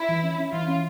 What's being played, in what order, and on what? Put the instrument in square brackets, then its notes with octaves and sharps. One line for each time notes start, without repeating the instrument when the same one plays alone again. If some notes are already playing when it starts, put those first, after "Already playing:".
Already playing: [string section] E4
[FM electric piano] E3
C#4
C#4
[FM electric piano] E3 [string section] F4
[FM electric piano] C#4